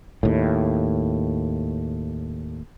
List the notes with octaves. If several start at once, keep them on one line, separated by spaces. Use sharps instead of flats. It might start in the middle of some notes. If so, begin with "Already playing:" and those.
D#2 A2